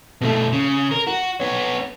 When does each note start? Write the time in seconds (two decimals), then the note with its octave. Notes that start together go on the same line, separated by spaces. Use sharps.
0.21 B2 A3
0.52 C#3
0.92 A#4
1.07 F#4
1.40 B3 C#5